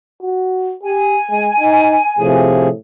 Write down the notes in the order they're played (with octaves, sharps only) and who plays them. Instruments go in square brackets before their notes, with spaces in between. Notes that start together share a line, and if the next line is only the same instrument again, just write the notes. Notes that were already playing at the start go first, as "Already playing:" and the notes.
[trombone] F#4
[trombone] G4 [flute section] G#5
[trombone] G#3
D#4
[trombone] A2 [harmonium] C3 F3 G#4